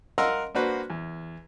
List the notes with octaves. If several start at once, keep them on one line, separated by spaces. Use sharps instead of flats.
A#4 D#5 F5 F#5 C6 E6
A#3 D4 F#4 B4 C5
E2